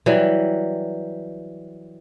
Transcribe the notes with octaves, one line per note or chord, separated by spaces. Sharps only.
E3 F#3 G3